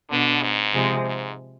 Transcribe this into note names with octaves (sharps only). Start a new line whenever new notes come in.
B2 D3 B3 D4
G#2
C3 F3 G#3
G#2